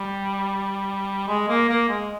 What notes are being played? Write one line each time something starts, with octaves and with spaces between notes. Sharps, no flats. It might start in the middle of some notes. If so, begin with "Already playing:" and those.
Already playing: G3
G#3
A#3
A#3
G#3